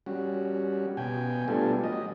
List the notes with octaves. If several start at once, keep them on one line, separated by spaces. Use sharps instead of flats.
G3 C#4 F#4
B2 G5 G#5
G3 A3 B3 D4 F4 A4
F#3 D#5